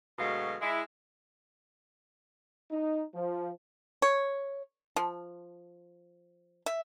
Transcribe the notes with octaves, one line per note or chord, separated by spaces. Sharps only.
D2 B2 F#3 G#3 F5
G#3 E4
D#4
F3
C#5
F3
E5